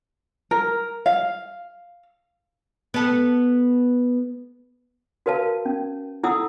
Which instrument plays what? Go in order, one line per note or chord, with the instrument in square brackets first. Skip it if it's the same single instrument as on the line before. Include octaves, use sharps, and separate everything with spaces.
[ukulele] A#4
F5
[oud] B3 A4
[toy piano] F#4 A#4 B4 F5 A5
C#4
E4 F4 A4 F#5 D#6 E6